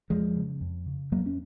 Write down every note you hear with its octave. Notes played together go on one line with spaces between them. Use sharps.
F2 F3 G#3
C#3
F2
C#3
F2 F#3 A#3
C#4